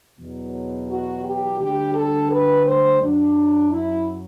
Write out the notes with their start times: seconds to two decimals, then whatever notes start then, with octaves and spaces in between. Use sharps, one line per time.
0.18 E2 B2 F#3
0.89 F#4
1.24 G4
1.59 D2 D3 G3 G4
1.95 A4
2.31 B4
2.66 C5
3.01 F#2 F#3 D4
3.72 E4